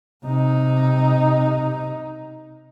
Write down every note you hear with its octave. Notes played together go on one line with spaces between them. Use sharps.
C3 D#4